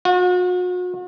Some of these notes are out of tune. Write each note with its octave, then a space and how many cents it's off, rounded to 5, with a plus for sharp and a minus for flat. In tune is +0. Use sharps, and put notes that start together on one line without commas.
F#4 -40